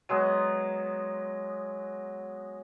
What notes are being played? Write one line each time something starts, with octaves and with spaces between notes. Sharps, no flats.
F#3 G#3 B3